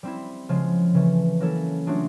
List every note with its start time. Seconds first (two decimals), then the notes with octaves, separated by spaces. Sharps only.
0.03 G3 C4 E4
0.49 C#3 F3 G#3
0.94 C#3 E3 A3
1.40 F#3 A#3 C#4 E4 A4
1.86 F#3 A3 D4 F4 G#4